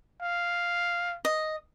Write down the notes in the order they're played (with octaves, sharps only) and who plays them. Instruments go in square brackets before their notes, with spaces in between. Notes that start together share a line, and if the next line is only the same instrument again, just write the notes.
[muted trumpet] F5
[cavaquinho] D#5